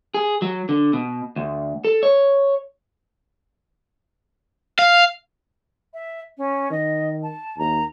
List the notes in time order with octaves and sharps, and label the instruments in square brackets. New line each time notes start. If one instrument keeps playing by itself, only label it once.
[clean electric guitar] G#4
F#3
D3
B2
D2
A4
C#5
[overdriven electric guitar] F5
[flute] E5
C#4
[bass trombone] D#3 [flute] D#5
[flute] A5
[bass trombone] D#2 [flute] A#5